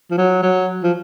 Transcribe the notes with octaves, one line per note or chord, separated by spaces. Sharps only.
F3
F#3
F#3
F3